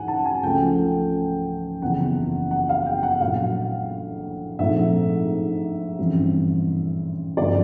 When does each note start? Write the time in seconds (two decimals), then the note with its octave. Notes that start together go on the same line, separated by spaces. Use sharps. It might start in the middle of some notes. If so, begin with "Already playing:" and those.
Already playing: A1 G#2 F#5 G#5
0.08 A5
0.25 G#5
0.42 C#2 C#3 F3 A3 G5
1.82 F#1 E2 C3 F#5
2.51 F#5
2.69 F5
2.86 G5
3.03 F#5
3.20 A#1 A2 F#3 F5
4.59 A#1 G#2 F3 A3 C4 E5
5.98 A1 G2 E3 G3 C4
7.37 G1 G2 D3 F3 A#3 D5